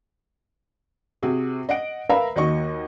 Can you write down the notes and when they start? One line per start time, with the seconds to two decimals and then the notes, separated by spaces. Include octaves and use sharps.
1.22 C3 F#4 G#4
1.69 D#5 F#5 D7
2.09 A#4 B4 E5 F5 A#5 B5
2.36 D#2 F#4 D#5 C#6